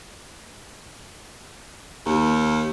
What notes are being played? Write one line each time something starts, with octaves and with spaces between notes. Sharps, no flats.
D#2